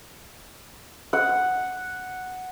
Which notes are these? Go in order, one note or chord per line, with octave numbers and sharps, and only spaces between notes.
F#5